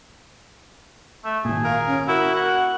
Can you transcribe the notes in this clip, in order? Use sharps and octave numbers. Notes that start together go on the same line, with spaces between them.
A3
G#1 A#2 G#4
A#4 F5
C#4
E4 F#4 A#4
F#5